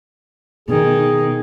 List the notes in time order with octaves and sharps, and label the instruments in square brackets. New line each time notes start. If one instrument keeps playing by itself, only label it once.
[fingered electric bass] B2 [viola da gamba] D#3 [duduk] G#4